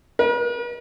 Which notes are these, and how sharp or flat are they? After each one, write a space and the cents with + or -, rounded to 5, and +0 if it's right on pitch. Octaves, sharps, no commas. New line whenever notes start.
B4 -45